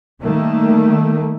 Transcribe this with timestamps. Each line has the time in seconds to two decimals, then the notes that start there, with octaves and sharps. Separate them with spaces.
0.21 D#3 G3 A3 A#3